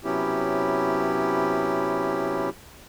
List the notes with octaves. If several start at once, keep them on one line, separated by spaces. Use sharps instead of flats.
C3 F#3 B3 C#4 E4 G4